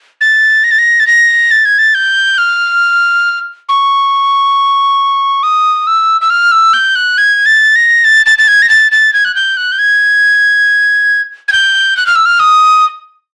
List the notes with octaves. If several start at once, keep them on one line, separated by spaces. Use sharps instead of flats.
A6
A#6
A6
A#6
A6
A#6
A6
G#6
A6
G6
F6
C#6
D#6
E6
E6
F6
E6
G6
F#6
G#6
A6
A#6
A6
A6
A6
G#6
A#6
A6
A6
G#6
F#6
G6
F#6
G6
G#6
G#6
G6
F#6
F6
E6
F6
D#6